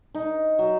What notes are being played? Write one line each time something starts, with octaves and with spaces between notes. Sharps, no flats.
D#4
F#3